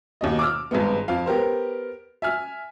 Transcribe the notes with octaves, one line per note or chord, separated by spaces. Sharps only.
D#2 B2 D#5
D6 E6 F6
G#1 G2 G#3 B3
F2 F4 F5
B3 G4 A#4 C5
E5 G#5 F6